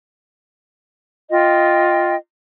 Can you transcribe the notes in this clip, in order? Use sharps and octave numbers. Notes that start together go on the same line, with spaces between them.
F4 D#5 G5